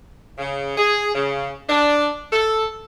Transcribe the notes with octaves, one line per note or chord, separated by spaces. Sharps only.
C#3
G#4
C#3
D4
A4